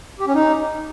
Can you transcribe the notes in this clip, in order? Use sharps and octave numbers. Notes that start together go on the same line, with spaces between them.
G4
C#4
D#4